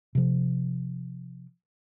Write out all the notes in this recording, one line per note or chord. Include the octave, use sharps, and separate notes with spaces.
C3 F3